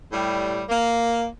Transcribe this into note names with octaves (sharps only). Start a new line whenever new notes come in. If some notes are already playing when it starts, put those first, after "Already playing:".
A2 G3
A#3